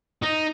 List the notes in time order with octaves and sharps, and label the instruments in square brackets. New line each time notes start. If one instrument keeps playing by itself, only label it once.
[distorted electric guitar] D#4